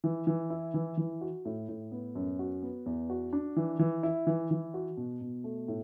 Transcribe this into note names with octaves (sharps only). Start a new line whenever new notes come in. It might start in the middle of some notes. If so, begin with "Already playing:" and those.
E3
E3
E4
E3
E3
F#4
A2
A2
B3
F#2
F#4
B3
E2
F#4
D4
E3
E3
E4
E3
E3
F#4
B2
B2
A3
A2